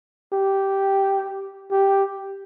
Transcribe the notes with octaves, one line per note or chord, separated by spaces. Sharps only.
G4
G4